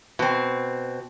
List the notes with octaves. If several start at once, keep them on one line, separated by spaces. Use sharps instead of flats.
B2 C4